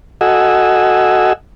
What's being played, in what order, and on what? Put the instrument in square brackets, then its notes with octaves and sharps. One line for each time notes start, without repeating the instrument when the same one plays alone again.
[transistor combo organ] F#4 A4 D#5 F#5 G#5 E6